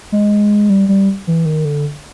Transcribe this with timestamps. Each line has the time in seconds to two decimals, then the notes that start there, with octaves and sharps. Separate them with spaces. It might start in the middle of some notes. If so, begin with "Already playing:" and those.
0.12 G#3
0.70 G3
0.89 G3
1.27 E3
1.45 D#3
1.65 D3